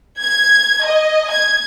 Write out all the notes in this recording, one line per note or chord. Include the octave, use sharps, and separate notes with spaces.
G#6
D#5
G#6